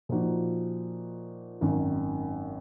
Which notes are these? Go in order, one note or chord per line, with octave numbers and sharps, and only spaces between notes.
A#2 F3 A#3 D#4 F#4
G#1 F#2 D#3